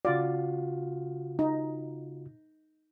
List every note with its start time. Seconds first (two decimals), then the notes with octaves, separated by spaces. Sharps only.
0.05 C#3 F4 F#4 D5
1.39 D#4